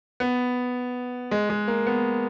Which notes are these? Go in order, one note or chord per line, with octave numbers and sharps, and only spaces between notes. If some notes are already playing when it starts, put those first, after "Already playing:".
B3
G#3
G#3
A#3
B3